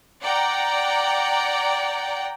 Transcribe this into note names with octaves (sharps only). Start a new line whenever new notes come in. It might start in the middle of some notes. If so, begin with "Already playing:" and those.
D5 F#5 G5 A#5